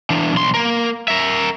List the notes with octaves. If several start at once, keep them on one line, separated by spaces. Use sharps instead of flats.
E3 D4
B1 C6
A#3 A#4
A#4 E5